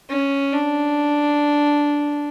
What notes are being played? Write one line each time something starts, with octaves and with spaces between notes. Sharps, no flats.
C#4
D4